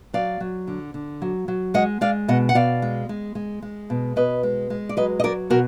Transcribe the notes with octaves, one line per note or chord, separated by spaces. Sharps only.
F#3 D5 F5
F#3
D3
D3
F#3
F#3
G#3 D#5 F#5
G#3 D5 F5
B2 D#5 F#5
F#5
B2 D5 F5
G#3
G#3
G#3
G#3
B2
B2 B4 D#5
G#3
G#3
D5
F#3 B4 D#5
D#5
F#3 A#4 D5
B2 F#4 A#4